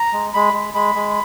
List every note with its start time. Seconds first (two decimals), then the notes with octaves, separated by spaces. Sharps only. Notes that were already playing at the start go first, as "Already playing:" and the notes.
Already playing: A#5
0.13 G#3
0.34 G#3 B5
0.53 G#3
0.74 G#3 B5
0.95 G#3